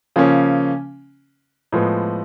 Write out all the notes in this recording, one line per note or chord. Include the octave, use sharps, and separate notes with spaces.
C#3 F3 A#3 C#4
A2 F3 G#3 B3